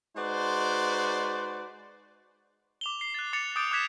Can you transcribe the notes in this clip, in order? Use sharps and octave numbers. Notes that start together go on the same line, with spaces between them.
G#3 D#4 F#4 B4 C5 D5
D6 F7 G7
C7 G7
F#6 A6
D6 A6 C#7 F7
D6 D#6 G6 A6 D7
D6 D#6 F#6 G#6 B6 E7